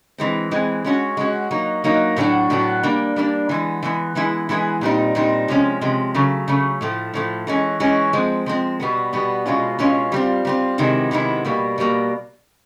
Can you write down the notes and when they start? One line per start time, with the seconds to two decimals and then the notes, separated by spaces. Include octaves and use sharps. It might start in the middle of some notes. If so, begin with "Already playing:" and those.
0.18 E3 G#3 C4
0.51 E3 G#3 C4
0.84 G#3 C#4 F#4
1.17 G#3 C#4 F#4
1.51 F#3 A#3 D#4
1.84 F#3 A#3 D#4
2.16 A2 F#3 B3 D4 F#4
2.50 A2 F#3 B3 D4 F#4
2.83 G3 A#3 D4
3.16 G3 A#3 D4
3.49 E3 G#3 B3
3.83 E3 G#3 B3
4.15 E3 G#3 B3 E4 G#4
4.49 E3 G#3 B3 E4 G#4
4.81 A#2 G3 C4 D#4
5.15 A#2 G3 C4 D#4
5.48 C3 F3 G#3 C#4
5.81 C3 F3 G#3 C#4
6.14 C#3 F#3 A3
6.48 C#3 F#3 A3
6.81 A2 F3 A3
7.13 A2 F3 A3
7.47 E3 G#3 C#4
7.80 E3 G#3 C#4
8.13 F3 G#3 C4
8.46 F3 G#3 C4
8.80 B2 G3 B3
9.13 B2 G3 B3
9.46 B2 G#3 C#4 F4
9.79 B2 G#3 C#4 F4
10.12 G3 C4 F4
10.45 G3 C4 F4
10.78 C3 D#3 G#3 B3 E4
11.11 C3 D#3 G#3 B3 E4
11.45 B2 G3 A#3
11.78 B2 G3 A#3